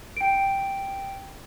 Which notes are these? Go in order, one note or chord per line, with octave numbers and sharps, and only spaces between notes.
G5 D7